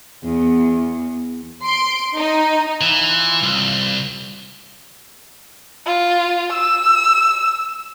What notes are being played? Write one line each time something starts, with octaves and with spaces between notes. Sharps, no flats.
E2 B3
C6 D7
D#4
E3 F4
C2
F4
E6